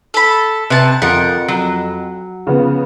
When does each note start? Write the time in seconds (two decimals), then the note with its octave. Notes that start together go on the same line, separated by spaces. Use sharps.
0.14 A4 B5
0.70 C3 B4 A5
1.02 F2 F3 A#4 F#5
1.48 F#3
2.47 C#3 F3 B3